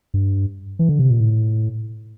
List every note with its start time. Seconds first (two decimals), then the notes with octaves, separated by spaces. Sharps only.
0.14 G2
0.79 E3
0.89 D3
0.99 C3
1.10 A#2
1.20 A2